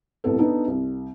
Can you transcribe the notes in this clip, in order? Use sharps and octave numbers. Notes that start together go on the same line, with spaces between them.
C2 A2 B3 A4
B3 D4 D#4 A4
C2